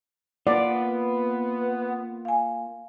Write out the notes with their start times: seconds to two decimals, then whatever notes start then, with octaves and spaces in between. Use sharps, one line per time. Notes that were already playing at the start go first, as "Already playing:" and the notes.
0.47 A#3 B3 F4 D5
2.25 F5 G#5